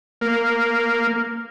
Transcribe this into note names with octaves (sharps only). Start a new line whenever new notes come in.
A#3